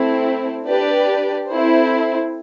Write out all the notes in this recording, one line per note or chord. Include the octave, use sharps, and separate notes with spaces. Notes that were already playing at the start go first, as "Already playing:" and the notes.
Already playing: A3 C4 E4
D4 G4 B4 D5
C4 E4 A4 C5